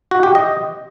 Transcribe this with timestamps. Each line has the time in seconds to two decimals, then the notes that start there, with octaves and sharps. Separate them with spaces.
0.11 F#4
0.23 G4
0.35 D#5